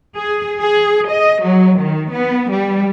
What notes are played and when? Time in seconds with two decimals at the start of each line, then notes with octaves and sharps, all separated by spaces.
0.18 G#4
0.62 G#4
1.11 D#5
1.44 F#3
1.80 D#3
2.16 B3
2.52 G3